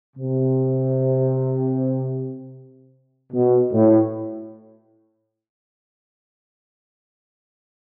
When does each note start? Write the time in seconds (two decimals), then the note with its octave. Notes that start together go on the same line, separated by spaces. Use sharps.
0.16 C3
3.33 B2
3.72 A2